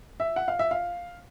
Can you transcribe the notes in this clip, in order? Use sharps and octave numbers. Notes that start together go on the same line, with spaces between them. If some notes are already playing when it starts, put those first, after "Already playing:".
E5
F#5
F5
E5
F5